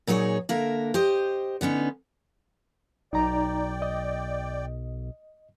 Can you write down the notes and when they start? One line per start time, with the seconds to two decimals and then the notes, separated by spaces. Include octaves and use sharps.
0.07 A#2 F#3 D#4 G#4 C#5
0.49 D3 A#3 A#4 E5
0.94 G4 C5 D#5
1.61 D3 B3 C#4 D#4
3.13 B1 D#4 D5 G5 A#5
3.82 D#5